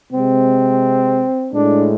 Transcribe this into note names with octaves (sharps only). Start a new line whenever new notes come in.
C3 G#3 C4
A2 G#3 D4